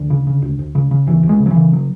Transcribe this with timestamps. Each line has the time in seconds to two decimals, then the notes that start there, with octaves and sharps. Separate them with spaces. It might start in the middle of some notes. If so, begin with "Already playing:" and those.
Already playing: D2 D3
0.10 C#3
0.27 C#3
0.42 D2
0.59 D2
0.75 C#3
0.91 C#3
1.07 D2 E3
1.23 D2
1.29 G#3
1.40 C#3
1.46 F#3
1.51 E3
1.56 C#3
1.73 F#3